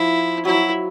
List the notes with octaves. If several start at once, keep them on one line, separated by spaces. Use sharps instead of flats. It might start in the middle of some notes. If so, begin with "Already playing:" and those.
Already playing: F3 E4
F#3 E4